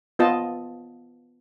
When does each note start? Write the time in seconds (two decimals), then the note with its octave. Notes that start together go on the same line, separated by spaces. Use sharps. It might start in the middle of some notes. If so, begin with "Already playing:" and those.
0.19 B3 F4 D#5 A5